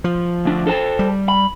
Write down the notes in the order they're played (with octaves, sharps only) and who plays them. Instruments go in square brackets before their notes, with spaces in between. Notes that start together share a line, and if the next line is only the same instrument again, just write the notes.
[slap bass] F3
[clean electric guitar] D2 D4
A4 C5 A5
[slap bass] G3
[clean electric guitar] B5